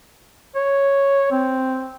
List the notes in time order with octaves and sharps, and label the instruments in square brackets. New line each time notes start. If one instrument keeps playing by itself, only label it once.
[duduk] C#5
C4